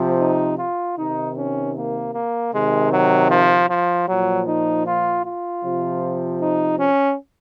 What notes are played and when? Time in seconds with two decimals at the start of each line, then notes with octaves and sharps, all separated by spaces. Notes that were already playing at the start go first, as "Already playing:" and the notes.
Already playing: C3 F3
0.20 D#4
0.58 F4
0.97 C3 D#3 D#4
1.36 C#4
1.75 A#3
2.13 A#3
2.52 C3 D#3 G#3
2.92 F#3
3.30 F3
3.69 F3
4.07 A#2 F3 F#3
4.47 D#4
4.86 F4
5.24 F4
5.64 C3 F3
6.41 D#4
6.79 C#4